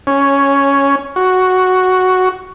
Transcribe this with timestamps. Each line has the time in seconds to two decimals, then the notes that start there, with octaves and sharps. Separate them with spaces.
0.07 C#4
1.16 F#4